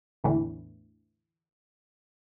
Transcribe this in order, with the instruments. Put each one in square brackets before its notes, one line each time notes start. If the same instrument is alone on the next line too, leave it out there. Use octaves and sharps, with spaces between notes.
[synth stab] A1 E2 A2 D3 E3